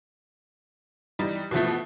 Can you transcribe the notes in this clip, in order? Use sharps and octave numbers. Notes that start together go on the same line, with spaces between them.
E3 G3 D#4
B2 E3 F3 A3